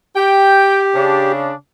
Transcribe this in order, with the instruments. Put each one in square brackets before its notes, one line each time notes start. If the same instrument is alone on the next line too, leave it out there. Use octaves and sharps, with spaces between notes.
[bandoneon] G4 [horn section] G5
[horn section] C#3 D4